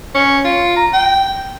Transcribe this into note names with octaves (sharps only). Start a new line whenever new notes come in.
C#4
F4
A#5
G5